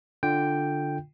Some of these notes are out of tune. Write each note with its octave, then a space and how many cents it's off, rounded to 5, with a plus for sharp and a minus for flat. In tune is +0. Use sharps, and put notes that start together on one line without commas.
D3 +0 F4 +0 G5 +0